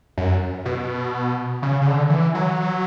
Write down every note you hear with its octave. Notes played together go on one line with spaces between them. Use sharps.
F#2
B2
C#3
C#3
D3
E3
F#3